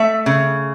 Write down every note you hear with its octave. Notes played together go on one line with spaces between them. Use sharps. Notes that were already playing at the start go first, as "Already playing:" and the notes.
Already playing: A3 E5
C#3